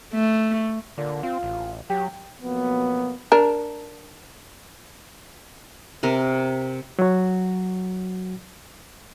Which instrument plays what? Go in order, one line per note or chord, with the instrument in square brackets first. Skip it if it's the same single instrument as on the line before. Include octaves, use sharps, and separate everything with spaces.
[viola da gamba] A3
[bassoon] A#2 [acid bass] D3
[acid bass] C4 [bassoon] F4
[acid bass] A1
[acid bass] F#3 [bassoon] G4
[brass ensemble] F2 B2 F#3 A#3 B3
[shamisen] D4 A#4
[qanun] C3 A#4
[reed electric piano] F#3 F#4